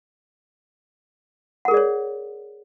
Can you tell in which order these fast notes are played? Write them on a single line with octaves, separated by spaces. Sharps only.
F#5 A#4 G#4 D5 C#5